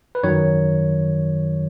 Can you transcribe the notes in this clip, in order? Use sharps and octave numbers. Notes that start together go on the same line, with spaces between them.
B4
F#2 D#3 F#3 C#5